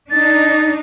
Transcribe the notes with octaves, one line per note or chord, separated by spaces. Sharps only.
D4 D#4 A6